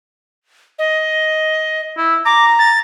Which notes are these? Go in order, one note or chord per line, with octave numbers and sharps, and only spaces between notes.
D#5
E4
A#5 D6
A6